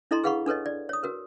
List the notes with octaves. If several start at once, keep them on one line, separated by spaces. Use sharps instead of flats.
D4 E4 A4 D#5 A#5 C6
G#4 B4 F5 F#5 B5 C#6
D4 A4 B4 C#5 D#5
D5
C#5 D#6
F#4 A#4 B4